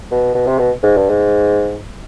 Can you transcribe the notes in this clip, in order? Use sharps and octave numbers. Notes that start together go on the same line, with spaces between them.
B2
B2
C3
B2
G#2
G2
G#2